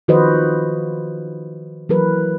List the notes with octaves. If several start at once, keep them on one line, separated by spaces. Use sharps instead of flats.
D#3 F3 F#4 B4 C5 D#5
E3 F#3 A#4 B4